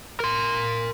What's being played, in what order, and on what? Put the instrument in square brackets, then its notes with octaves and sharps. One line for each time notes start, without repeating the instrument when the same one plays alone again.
[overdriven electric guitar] A#4 C6